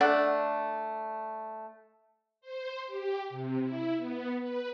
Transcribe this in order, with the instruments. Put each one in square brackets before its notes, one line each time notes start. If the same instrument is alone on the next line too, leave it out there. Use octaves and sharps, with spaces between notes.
[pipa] A3 D4 F#5
[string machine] C5
G4
C3
E4
B3
B4